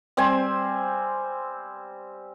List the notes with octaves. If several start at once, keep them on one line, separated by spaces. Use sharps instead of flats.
G3 C4 C5 G#5